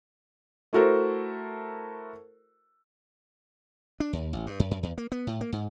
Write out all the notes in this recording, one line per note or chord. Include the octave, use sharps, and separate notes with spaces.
A3 E4 F#4 A4 A#4 C5
D4
D#2
A1
G2
F#2
F#2
E2
A#3
B3
A2
A#3
G#2